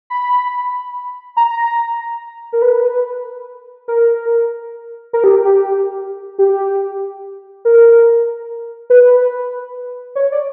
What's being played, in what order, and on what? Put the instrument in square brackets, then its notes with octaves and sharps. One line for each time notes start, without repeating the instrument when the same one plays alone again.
[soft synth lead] B5
A#5
A#4
B4
A#4
A#4
G4
G4
G4
A#4
B4
C#5
D5